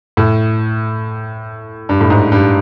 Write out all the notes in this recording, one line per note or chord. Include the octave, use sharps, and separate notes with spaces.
A2
G2
A2
G#2
G2